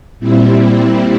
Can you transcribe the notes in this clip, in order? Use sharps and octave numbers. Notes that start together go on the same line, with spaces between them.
A#2 G3 C4 E4